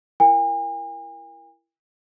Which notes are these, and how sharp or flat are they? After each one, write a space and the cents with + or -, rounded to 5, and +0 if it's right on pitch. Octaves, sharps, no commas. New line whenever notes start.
E4 +25 A#4 +0 G#5 -45